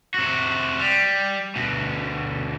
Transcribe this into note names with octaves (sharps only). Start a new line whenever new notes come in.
C3 F#4
G3
D2 B2